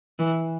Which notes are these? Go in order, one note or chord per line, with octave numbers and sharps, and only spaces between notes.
E3